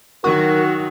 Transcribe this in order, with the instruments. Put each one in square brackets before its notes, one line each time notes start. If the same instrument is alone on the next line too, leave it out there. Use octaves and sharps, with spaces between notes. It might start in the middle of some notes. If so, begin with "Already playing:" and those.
[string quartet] D#3 F#3 [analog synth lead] F#4 [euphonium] A#4